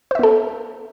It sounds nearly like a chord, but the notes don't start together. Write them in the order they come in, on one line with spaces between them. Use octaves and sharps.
C5 E5 B3 A4